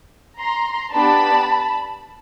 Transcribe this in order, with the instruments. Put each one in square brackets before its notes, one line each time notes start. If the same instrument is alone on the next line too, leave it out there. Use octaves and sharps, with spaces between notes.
[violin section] A#5 C6
B3 D4 G4 A5 B5